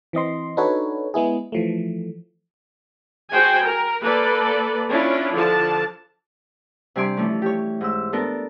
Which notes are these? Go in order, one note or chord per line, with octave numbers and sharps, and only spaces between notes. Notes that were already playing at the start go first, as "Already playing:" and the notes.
E3 C4 D#5 C6
D4 D#4 F#4 A4 B4 C#5
G#3 B3 E4 G#4
E3 F3 A3
F#4 G#4 C5 G5 G#5
A#4
A#3 A4 B4 D5
C#4 D4 E4 F4
D3 F3 A5
C3 G3 D4 G#5 C6 D6
E3 F3 A3 C#4
G4 C#5
G#2 E6
B3 D4 A4 A#4